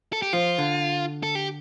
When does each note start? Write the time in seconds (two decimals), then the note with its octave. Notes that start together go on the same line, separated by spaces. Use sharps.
0.13 A4
0.22 G4
0.33 F3 F4
0.58 D3
1.23 A4
1.35 G4